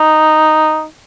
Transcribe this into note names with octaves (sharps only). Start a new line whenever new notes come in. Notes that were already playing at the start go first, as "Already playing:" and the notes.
Already playing: D#4